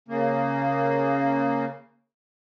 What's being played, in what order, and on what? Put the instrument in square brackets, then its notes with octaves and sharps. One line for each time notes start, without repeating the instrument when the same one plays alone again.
[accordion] C#3 A#3